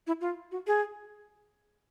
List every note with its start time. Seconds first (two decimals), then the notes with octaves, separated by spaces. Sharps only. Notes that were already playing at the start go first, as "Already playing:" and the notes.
0.07 E4
0.21 F4
0.52 F#4
0.67 G#4